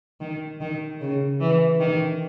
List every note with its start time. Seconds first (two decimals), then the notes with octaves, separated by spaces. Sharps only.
0.21 D#3
0.61 D#3
1.01 C#3
1.40 E3
1.80 D#3